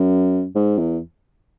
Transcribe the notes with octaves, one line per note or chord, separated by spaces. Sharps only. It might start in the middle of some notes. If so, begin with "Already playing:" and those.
Already playing: F#2
G#2
E2